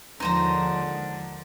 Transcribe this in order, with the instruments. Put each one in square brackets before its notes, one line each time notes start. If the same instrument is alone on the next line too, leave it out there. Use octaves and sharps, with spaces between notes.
[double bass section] D#2 F3 G#3 [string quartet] D3 [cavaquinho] D#4 C5 A#5